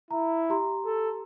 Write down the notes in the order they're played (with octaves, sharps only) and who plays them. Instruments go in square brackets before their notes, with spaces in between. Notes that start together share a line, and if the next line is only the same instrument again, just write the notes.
[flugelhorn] E4 [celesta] A#5
[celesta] G4 A#5 C6
[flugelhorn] A4